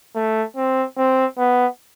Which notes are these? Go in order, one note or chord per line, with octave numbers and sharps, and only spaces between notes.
A3
C4
C4
B3